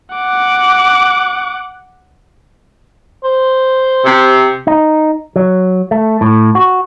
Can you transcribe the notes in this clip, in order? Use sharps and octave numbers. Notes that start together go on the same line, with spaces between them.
F#5 D6
C5
C3
D#4
F#3
A3
A2
F#4